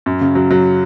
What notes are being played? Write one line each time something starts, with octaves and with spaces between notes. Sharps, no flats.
F#2
C#3
F#3
F#3